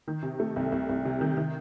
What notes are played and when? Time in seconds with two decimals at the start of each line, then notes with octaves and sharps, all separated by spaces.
0.08 D#3
0.23 C3
0.40 A3
0.56 C2
0.72 C2
0.89 C2
1.05 C3
1.21 D#3
1.37 D#3